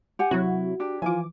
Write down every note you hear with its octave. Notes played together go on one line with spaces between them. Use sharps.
G4 F#5 G#5
C3 F#3 E4 F#4
D4 G4
E3 F3 F4 G#5 D6